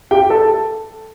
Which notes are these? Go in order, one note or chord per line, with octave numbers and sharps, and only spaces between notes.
G4 G5
A4 A5